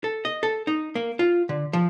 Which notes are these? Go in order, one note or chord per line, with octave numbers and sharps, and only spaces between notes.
A4
D#5
A4
D#4
A#3
F4
D3
F3